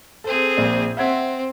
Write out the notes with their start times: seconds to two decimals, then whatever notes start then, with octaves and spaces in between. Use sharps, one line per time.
0.24 C4 G#4 A4 C5
0.57 A#1 A#2 D5
0.97 C4 E5 F#5 G#6